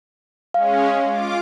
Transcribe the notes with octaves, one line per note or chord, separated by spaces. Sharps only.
G#3 C#4 F5
F4 D6